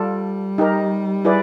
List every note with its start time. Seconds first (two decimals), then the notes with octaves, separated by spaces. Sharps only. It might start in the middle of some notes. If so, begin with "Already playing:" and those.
Already playing: G3 F4 A4 D5
0.58 D#4 G4 A#4
1.25 E4 G#4 B4 D5